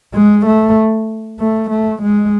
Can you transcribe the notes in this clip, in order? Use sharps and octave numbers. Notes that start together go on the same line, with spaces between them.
G#3
A3
A3
A3
G#3